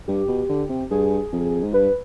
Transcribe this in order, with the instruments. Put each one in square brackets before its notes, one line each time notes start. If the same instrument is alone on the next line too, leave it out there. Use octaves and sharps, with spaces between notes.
[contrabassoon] G2 [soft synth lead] G4
[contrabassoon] B2
D3
C3
[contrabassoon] G2 [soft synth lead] G#4
[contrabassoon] F2
G#2
[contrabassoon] G2 [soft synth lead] B4